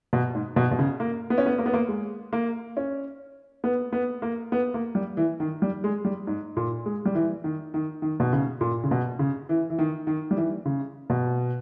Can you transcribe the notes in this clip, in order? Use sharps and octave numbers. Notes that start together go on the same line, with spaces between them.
B2
G#2
B2
B2
C#3
A#3
B3
C#4
B3
A#3
B3
A#3
G#3
A#3
C#4
B3
B3
A#3
B3
A#3
G3
E3
D#3
G3
G#3
G3
G#2
A#2
G#3
G3
E3
D#3
D#3
D#3
B2
C#3
A#2
C#3
B2
C#3
E3
E3
D#3
D#3
G3
E3
C#3
B2